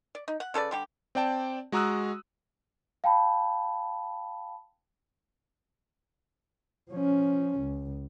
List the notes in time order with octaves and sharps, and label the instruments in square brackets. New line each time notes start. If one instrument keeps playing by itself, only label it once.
[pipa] D5
D#4
F#5
C#3 A4 B4 D5
D3 G3 G4
[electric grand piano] C4 D5 G5 A5
G#3 F#4 A#5 D#6 E6 F#6
[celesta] F5 G5 A5 B5
[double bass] F3 C#4
C#2